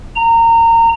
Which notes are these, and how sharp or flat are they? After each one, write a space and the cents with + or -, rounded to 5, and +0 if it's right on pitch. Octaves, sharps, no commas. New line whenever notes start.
A#5 -25